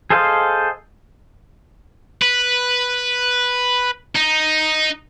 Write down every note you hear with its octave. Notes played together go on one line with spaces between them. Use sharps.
G#4 A4 C5 D#5 F5
B4
D#4